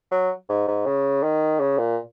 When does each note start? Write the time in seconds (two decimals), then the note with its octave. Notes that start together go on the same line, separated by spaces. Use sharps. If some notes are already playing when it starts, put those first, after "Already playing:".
0.11 F#3
0.49 G#2
0.68 G#2
0.86 C#3
1.23 D#3
1.60 C#3
1.78 A#2